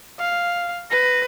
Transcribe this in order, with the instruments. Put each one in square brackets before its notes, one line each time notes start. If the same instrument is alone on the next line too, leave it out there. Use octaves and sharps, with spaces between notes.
[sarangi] F5
[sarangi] B4 [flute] A#6